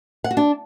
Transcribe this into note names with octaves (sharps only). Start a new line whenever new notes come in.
F#5
F#4
D4